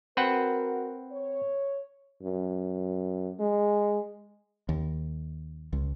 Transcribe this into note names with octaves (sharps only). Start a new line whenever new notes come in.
C4 F#4 A#4 B4 F#5
C#5
F#2
G#3
D#2
C#2